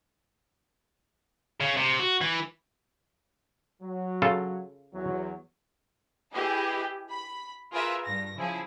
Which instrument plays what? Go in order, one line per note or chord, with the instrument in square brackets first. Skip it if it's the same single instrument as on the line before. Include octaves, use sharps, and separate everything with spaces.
[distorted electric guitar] C#3
C3
F#4
E3
[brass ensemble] F#3
[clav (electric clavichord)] C#3 F4 A4
[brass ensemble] E2 F#3
[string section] E4 G4 G#4 B4 D#5
B5
F4 G#4 A#4 B4 E5
G2 A#6
C#3 F3 E4 G#4